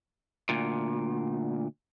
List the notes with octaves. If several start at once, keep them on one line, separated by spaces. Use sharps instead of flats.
D2 A#2